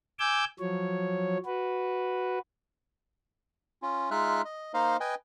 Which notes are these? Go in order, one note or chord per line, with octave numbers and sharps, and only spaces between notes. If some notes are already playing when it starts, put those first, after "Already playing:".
G#5 D6 E6 G6
F3 F#3 C#5
F#4 B4
C#4 F4
G#3 D#4 F4 E5 F6 F#6
D#5
A#3 D#4 C5 D#5 F5
B4 D#5 G5 G#5